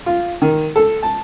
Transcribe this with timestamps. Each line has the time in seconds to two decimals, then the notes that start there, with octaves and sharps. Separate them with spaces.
0.06 F4
0.42 D#3
0.76 A4
1.03 A5